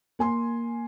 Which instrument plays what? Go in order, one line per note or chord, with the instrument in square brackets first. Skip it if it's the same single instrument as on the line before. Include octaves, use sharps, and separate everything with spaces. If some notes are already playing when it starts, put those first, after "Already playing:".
[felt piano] A#3 G#5 C6